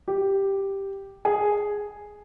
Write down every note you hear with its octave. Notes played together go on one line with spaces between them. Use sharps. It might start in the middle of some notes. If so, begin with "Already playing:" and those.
G4
G#4